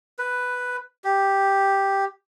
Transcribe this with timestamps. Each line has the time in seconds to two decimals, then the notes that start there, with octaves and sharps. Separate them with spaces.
0.19 B4
1.04 G4